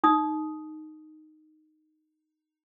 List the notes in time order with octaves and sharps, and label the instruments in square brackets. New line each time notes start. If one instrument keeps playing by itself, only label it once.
[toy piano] D#4 D#6